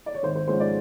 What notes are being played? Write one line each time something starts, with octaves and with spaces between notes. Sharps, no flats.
D5
C#5
G#1 C5
C5
G#2 F3 G#3 C#4 C5
D5